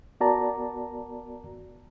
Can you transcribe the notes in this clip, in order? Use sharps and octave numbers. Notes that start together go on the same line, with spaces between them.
B3 F#4 A#4 D5 A5 A#5